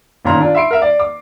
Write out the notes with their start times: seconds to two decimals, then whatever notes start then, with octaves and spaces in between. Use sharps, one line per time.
0.25 G1 F#2 A#2 D#3 A#5 C6
0.41 D4 F4
0.55 E5 B5 C6 C7 D7
0.71 A#4 E5
0.82 D5
1.00 D6